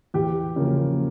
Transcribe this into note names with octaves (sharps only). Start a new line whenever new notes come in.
E2 G4
C#3 F3 A#3